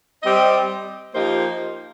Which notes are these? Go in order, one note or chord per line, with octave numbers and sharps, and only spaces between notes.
G3 C4 G4 D#5
F3 A#3 D#4 G4 C5